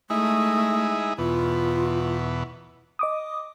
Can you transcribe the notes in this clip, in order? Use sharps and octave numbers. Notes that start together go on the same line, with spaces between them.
G#3 A3 D#4 E4
E2 B2 F4
D#5 D6 D#6